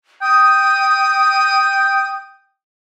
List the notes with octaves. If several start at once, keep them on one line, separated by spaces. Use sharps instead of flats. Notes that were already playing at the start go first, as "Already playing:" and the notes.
G5 D#6